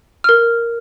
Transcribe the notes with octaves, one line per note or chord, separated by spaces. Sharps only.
A#4 F6